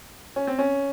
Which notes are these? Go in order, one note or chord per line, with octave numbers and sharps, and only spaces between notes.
C#4
C4
C#4